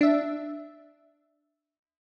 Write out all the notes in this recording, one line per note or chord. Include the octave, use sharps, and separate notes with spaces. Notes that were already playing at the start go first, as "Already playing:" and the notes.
D4 E5